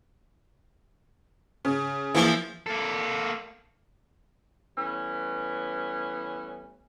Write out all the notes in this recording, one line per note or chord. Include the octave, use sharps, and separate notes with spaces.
C#3
E3 F3 A#3 E4 G#4
A#3 A4
E3 G3 A3 B3 C#4